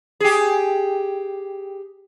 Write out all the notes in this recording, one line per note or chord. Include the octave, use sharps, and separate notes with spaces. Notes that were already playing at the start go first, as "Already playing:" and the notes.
G4 G#4